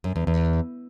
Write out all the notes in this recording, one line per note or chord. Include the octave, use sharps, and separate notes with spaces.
F#2
E2
E2